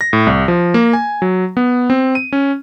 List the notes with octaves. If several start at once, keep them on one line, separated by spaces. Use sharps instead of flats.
A#6
A2
C2
F3
A#3
G#5
F#3
B3
C4
D#7
C#4